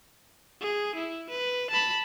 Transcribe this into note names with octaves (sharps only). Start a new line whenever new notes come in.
G#4
E4
B4
A5 B5